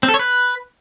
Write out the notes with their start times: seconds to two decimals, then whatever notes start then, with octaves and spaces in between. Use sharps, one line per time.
0.03 C4
0.09 A4
0.14 C#5
0.19 B4